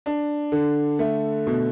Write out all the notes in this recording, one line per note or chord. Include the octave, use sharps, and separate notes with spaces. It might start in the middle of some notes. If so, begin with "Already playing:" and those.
D4
D3
A3
B2